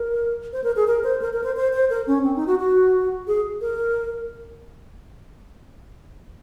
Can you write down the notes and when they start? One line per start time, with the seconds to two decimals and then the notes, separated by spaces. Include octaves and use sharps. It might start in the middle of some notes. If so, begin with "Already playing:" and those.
Already playing: A#4
0.53 C5
0.64 A#4
0.76 G#4
0.87 A#4
1.04 C5
1.22 A#4
1.33 A#4
1.44 C5
1.56 C5
1.73 C5
1.90 A#4
2.07 C#4
2.24 C4
2.36 D#4
2.47 F#4
2.59 F#4
3.27 G#4
3.61 A#4